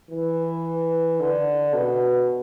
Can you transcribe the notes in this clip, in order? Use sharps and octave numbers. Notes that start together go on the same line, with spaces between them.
E3
D3
B2